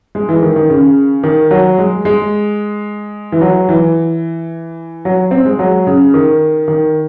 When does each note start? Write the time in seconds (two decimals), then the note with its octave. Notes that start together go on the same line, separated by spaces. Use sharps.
0.15 G#3
0.29 E3
0.42 D#3
0.56 D#3
0.70 C#3
1.23 D#3
1.51 F#3
1.78 G#3
2.05 G#3
3.32 E3
3.41 F#3
3.69 E3
5.05 F#3
5.31 C4
5.45 G#3
5.59 F#3
5.87 C#3
6.14 D#3
6.68 D#3